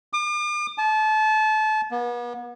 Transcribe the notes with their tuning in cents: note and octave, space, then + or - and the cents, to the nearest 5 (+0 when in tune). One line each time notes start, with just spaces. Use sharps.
D6 +45
A5 -30
B3 -40